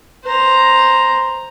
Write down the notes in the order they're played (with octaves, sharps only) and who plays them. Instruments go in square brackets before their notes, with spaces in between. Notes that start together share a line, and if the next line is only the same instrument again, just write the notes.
[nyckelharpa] C5 A#5